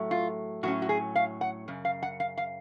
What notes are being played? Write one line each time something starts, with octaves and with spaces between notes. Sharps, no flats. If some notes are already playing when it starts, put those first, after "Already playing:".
Already playing: A2 F#3 A3
F4
A2 F#3 C#4 F#4
F#4
G#4
F5
F#5
F#2 C#3
F5
F#5
F5
F5